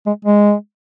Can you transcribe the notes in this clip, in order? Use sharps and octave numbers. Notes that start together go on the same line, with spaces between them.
G#3
G#3